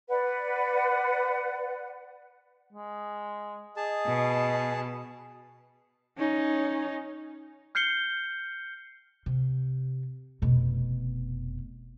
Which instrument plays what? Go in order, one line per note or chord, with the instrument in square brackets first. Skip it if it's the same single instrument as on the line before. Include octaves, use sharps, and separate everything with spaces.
[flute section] B4 D5 F#5
[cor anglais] G#3
[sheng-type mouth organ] G#4 A5 [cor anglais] D#5
[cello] B2
[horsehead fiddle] C#4 D#4
[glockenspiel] F6 G6 C7 C#7 G7
[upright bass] C3
F1 B2